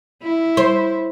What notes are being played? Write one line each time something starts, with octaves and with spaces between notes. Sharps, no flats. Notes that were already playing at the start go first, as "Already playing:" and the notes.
E4
C5